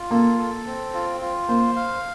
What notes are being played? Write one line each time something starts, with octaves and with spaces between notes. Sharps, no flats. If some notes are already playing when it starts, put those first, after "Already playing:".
Already playing: F4
A#3 A4
A4
C4
F4
F4
A#3 C5
F5